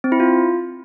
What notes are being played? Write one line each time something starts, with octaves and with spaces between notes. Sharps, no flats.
C4
E4
F4